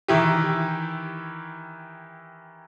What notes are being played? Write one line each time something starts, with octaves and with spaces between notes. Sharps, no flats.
D#3 E3 E4 G4